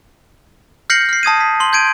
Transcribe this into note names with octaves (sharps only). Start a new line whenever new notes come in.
F6 G6 A#6 C7 C#7 F#7
F6 C7
A5 D#6 G#6 D#7
B6
C6 F#7
G6 G#6 D7 D#7